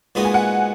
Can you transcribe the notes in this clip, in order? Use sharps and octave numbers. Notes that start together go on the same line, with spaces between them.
A#2 G#3 B3 D#4 F#4
G#5
F#5